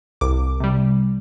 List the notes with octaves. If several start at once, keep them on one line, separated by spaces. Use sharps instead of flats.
C2 D6
C3 G3